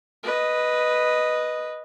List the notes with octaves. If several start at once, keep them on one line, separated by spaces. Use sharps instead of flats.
B4 D#5